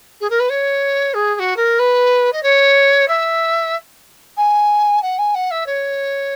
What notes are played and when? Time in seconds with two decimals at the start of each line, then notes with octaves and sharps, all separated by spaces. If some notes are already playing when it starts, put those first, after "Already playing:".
0.20 G#4
0.30 A#4
0.39 B4
0.49 C#5
1.14 G#4
1.35 G#4
1.39 F#4
1.56 A#4
1.79 B4
2.32 D#5
2.43 C#5
3.08 E5
4.37 G#5
5.02 F#5
5.18 G#5
5.34 F#5
5.51 E5
5.66 C#5